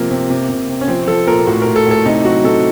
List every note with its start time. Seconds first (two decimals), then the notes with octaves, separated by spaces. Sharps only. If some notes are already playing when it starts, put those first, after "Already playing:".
Already playing: C3 F3 A#3
0.11 C3
0.30 C3
0.49 C3
0.69 C3
0.81 C#4
0.88 F3 C4
1.07 F3 A4
1.27 A#2 A#4
1.47 A2 F#4
1.62 A2 A#4
1.76 A4
1.86 A2 A4
2.06 C3 D#4
2.25 F#3 F#4
2.44 C3 A4